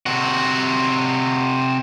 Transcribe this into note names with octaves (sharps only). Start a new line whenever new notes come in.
C3 F#4